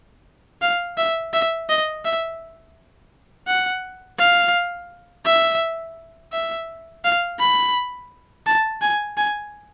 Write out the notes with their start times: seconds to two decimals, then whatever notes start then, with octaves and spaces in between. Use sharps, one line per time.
0.62 F5
0.98 E5
1.33 E5
1.69 D#5
2.05 E5
3.47 F#5
4.19 F5
5.25 E5
6.32 E5
7.04 F5
7.39 B5
8.46 A5
8.82 G#5
9.17 G#5